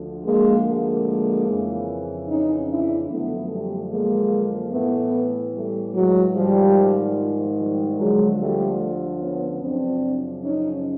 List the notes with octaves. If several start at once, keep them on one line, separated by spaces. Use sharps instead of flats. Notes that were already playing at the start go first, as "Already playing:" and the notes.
Already playing: D2 D3 F3
G#3 A#3
G#3 A#3
F2 C#3 E3
C#4 D#4
D4 E4
F#2 D3 F3 A3 B3
G3 A3
G#3 A#3
A2 E3 A3 B3
G3 A3
F#3 G#3
G#2 D#3 F3 G3
F3
F3 G3
D2 D3 F3 F#3 G#3
G3 A3
B3 C#4
F#2 C#3 F3 C4 D4
C#4 D#4